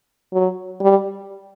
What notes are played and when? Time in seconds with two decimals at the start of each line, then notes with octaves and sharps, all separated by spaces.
0.33 F#3
0.81 G3